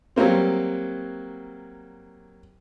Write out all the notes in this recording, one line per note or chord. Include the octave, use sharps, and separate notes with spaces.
F#3 G3 A#3 C4